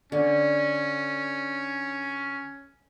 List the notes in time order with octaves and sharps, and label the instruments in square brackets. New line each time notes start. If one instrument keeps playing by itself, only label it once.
[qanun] D3 [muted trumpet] C#4